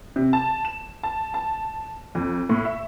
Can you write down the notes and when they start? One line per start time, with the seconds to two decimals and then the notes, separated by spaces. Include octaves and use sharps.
0.16 C3
0.33 A5
0.65 E7
1.03 A5
1.34 A5
2.15 F2
2.49 A2
2.65 E5